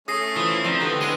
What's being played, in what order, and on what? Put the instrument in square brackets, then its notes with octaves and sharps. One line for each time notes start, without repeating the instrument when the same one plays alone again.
[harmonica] A3 C#4 [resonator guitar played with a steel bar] G#4 [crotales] D#6 A#6 C7
[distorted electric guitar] E3 [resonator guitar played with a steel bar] F4 C5 [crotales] D#6
[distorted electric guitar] F3 [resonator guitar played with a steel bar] C4 D5 A#5
[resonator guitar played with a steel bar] A2 D3 G4 [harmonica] B4
[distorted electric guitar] G#3 [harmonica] B3 C6 [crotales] D#7